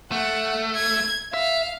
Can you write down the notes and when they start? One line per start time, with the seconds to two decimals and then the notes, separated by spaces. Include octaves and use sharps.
0.12 A3 F#5
0.76 G#6
1.34 E5 F5